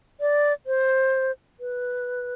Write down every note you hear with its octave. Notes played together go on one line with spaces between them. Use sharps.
D5
C5
B4